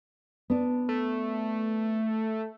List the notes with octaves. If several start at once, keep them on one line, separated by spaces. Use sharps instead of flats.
B3 D4
A3